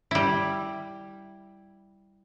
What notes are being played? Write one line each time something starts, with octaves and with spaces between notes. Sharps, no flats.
G3 E4